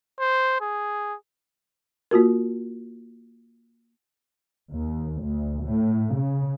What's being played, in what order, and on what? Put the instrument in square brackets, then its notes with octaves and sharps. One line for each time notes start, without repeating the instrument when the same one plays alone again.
[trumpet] C5
G#4
[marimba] A#3 F4 F#4 A#4
[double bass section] D#2
D2
A2
C#3